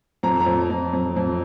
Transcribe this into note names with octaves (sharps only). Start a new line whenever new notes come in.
F2 A#5
A#5
F2
F2
F2
F2